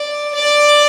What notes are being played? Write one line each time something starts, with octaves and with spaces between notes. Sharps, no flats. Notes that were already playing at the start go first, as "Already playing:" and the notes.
Already playing: D5
D5